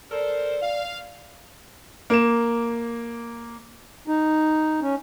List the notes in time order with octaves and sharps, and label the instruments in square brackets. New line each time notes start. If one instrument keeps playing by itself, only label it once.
[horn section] A4 A#4 C5 [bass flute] D5
[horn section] F5
[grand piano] A#3 E7
[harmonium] D#4
C#4